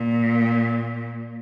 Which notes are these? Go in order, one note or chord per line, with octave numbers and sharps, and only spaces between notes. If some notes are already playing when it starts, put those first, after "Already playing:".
Already playing: A#2